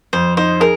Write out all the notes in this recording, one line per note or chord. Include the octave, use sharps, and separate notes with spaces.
F2 C5
D#4 C5
G#4 A#4